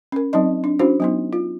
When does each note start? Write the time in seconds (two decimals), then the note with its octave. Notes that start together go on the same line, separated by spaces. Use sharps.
0.12 C#4 A#4
0.33 F#3 C4 D#4 D5 D#5
0.64 D4
0.79 C#4 D4 E4 F#4 C5
1.00 F#3 B3 D#4
1.33 F4